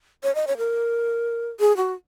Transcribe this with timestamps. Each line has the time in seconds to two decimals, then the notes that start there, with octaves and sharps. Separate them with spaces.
0.24 C#5
0.35 D#5
0.47 C#5
0.58 A#4
1.60 G#4
1.77 F#4